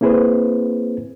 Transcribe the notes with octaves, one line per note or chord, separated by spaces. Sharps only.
A#3 C4 E4 G#4 B4 C5